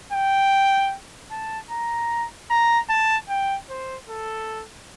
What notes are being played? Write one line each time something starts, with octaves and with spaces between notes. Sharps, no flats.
G5
A5
A#5
A#5
A5
G5
C5
A4